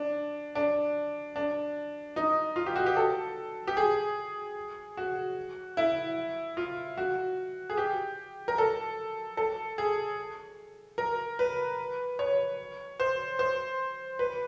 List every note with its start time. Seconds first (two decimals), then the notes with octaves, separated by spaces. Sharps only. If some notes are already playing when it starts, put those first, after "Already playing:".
Already playing: D4
0.55 D4
1.36 D4
2.16 D#4
2.56 F4
2.66 G4
2.76 F#4
2.86 G4
2.97 A4
3.67 G4
3.77 G#4
4.97 F#4
5.77 E4
6.57 F4
6.98 F#4
7.70 G#4
7.77 G4
8.48 A#4
8.58 A4
9.37 A4
9.78 G#4
10.98 A#4
11.39 B4
12.19 C#5
13.00 C5
13.39 C5
14.19 B4